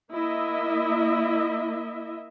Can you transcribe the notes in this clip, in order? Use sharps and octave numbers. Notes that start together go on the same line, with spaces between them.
A#3 E4 D#5 E5